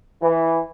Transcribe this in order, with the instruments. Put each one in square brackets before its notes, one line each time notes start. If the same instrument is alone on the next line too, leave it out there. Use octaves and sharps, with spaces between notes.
[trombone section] E3